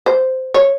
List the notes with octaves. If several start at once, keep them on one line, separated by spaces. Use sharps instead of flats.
C5
C#5